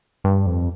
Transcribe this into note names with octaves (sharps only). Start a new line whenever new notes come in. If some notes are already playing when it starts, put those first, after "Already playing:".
G2
F2